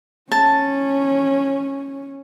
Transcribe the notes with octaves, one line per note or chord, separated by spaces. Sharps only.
C#4 A5